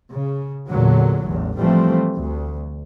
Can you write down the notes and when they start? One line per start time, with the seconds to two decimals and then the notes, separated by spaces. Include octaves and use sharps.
0.11 C#3
0.69 E2 A#2 D3 F#3
1.26 A1 E2
1.58 E3 F3 G3 A3 C4
2.15 D2